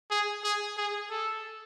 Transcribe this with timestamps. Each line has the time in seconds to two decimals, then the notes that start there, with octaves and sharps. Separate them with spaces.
0.11 G#4
0.43 G#4
0.77 G#4
1.10 A4